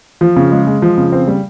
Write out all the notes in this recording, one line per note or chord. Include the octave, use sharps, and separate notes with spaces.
F3
C#3
G#3
G#3
F3
C#3
C4
G3